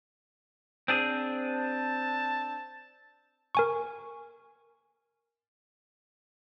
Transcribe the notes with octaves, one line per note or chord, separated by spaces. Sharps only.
C4 D4 G#4
A5
A#4 G#5 C#6